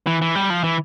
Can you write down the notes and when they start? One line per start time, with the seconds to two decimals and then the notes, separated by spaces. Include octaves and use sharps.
0.07 E3
0.22 E3
0.35 G3
0.50 F3
0.64 E3